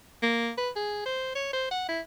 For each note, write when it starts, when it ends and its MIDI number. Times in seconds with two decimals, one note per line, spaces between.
0.23 0.50 58
0.58 0.70 71
0.76 1.02 68
1.06 1.32 72
1.35 1.52 73
1.53 1.67 72
1.71 1.85 78
1.89 2.01 64